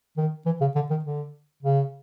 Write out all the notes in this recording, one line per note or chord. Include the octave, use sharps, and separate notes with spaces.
D#3
E3
C#3
D3
D#3
D3
C#3